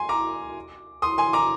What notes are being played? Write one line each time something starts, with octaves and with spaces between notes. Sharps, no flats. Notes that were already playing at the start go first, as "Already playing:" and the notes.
Already playing: G#5 C6
A#5 D6
C6 D#6
G#5 C6
A#5 D6